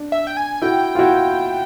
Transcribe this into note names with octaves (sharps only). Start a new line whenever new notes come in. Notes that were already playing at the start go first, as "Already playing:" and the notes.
Already playing: D4
E5
G5
G#5
E4 F#4 G5
F4
E4 F#4